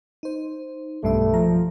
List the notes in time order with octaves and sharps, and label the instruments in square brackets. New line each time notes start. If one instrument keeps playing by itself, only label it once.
[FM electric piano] D#4 C5
[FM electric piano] B1 B2 E5 [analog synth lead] G2 [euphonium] A3
[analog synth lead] F3 [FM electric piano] A#5